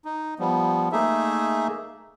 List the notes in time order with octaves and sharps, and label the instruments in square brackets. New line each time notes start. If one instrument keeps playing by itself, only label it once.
[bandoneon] D#4
F3 G3 B3
A3 A#3 D#4 G#4 E5